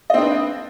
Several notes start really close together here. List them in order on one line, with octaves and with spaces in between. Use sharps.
D#5 C4 D4 B4